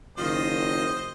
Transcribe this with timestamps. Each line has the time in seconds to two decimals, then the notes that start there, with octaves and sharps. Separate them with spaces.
0.18 F#1 D#3 F4 C5 D#5